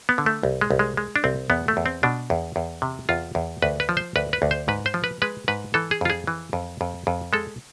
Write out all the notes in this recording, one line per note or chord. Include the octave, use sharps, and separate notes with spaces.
B3
D3
A3
C2
G#3
C2
G#3
G#3
D4
C2 C4
E2 B3
A3
E2
C4
B2 D4
E2
E2
C3
E2 F4
E2
D2 B4
B4
F3
C5
D2 B4
B4
D2
C5
G#2 B4
C5
F3
B4
G#3 B4
G#2 B4
E3 A4
G#4
F2 F4
G#4
E3
F2
F2
F2
G#3 A4